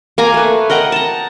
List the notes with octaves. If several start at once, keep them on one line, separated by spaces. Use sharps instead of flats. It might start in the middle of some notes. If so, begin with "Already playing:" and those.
A#3 G#5 A#5 D6
A3 B4
A#4 D#5 F#5 G5
A5 A#5